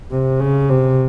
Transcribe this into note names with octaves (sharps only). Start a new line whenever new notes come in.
C3
C#3
C3